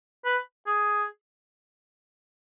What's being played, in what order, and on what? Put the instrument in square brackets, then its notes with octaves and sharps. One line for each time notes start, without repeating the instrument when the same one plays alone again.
[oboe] B4
G#4